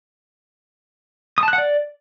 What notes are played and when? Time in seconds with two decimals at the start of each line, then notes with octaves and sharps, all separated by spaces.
1.38 D#6
1.43 A5
1.48 F#6
1.53 F#5
1.58 D5